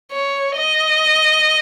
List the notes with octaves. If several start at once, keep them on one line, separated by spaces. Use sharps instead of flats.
C#5
D#5